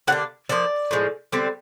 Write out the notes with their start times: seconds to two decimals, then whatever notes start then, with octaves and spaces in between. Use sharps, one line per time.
0.07 D3 G3 A#3 D4 F#5
0.49 F3 A#3 D4 D5
0.91 A2 F3 G#3
1.32 D3 G3 C4